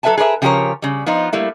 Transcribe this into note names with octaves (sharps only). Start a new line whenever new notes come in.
F#3 A4 B4 E5 G#5 A5
G#4 A#4 B4 C#5 E5
C#3 F3 G4 G#4 A#4 C#5
C#3 G3
F3 B3 D#4 F4
G3 A3 A#3 E4